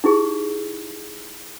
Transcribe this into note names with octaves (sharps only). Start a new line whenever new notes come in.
D#4 E4 G4 G#4